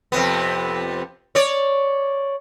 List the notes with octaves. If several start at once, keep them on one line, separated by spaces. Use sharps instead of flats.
F2 C3 B3
C#5 D5